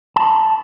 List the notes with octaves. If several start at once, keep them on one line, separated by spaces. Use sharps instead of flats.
A5